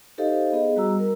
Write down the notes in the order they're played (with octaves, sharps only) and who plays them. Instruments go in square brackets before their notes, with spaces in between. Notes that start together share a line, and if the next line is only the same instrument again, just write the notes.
[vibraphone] D#4 G4 A4 C5 D#5 F5
B3 G#4 D#5
G3 F#4 A#5 E6
A#4